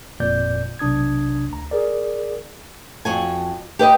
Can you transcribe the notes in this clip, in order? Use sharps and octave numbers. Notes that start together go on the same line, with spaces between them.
G1 F2 A#2 A#3 D5 G6
B1 C3 D4 D#6 G#6
D2 A#5
G#4 A#4 D5
F2 F#4 G#5
G4 B4 D#5 G5